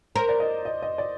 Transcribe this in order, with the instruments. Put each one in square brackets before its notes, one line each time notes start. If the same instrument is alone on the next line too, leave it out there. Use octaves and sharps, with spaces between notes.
[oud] A#4 [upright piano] C5
[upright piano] D5
D#5
D#5
D#5
D5